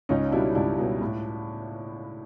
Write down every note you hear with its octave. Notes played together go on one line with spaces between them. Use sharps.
C#2 C#4 D#4
B2 G3 D4 E4
C#2 D4 E4
B2 G3
A2